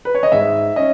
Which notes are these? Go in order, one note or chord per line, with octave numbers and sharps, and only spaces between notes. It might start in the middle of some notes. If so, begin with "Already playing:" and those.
B4
C#5
D#5
G#2 E5
C#4 D#5